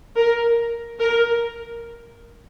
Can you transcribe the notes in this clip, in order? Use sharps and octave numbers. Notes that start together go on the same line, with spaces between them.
A#4
A#4